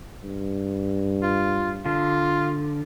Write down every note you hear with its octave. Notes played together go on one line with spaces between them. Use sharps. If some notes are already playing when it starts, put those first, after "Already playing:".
G2
F4
D3 F4